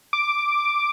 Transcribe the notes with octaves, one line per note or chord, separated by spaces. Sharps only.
D6